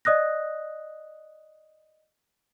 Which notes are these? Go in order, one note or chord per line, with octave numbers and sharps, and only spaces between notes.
D5 D#5 D#6 F#6 A#6